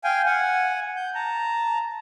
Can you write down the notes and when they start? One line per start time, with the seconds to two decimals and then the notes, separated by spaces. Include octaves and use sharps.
0.04 F5 G5 G#5
0.26 F#5 G#5
0.96 G6
1.15 A5 A#5